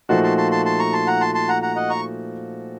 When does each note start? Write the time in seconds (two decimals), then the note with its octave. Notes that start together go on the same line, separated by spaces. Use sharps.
0.09 A#2 F3 A3 D#4 F#4 A5 C6
0.23 A5 C6
0.37 A5 C6
0.51 A5 C6
0.65 A5 C6
0.79 A#5 C#6
0.93 A5 C6
1.07 F#5 A#5
1.21 A5 C6
1.35 A5 C6
1.49 F#5 A#5
1.62 F#5 A#5
1.76 D#5 F#5
1.90 A#5 C#6